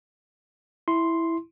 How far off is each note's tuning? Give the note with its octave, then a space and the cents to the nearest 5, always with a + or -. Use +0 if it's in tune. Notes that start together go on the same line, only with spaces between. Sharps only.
E4 +0 C6 +0